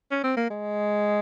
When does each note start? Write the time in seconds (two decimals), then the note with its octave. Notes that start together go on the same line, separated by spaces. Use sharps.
0.11 C#4
0.23 C4
0.37 A#3
0.50 G#3